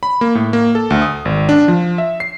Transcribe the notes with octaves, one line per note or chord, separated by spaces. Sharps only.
B5
A#3
A2
A#3
A4
D2
D#6
G#1
D4
F3
E5
C7